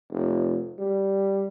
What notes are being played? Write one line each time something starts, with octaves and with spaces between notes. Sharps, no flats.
F1
G3